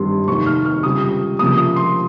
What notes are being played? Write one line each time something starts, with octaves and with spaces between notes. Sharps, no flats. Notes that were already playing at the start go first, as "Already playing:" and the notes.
Already playing: G#1 G2 G3 C6
F1 D#2 D#3 C#6
F6
F6
C#2 C3 G3 C4 D#6
C#2 C3 F3 A#3 D#6
D#6
C6